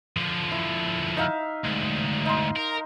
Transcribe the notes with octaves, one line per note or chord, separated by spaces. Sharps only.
D3 F3
E4
D#4 E5 F5
D2 G#2
D#4 C6
A#4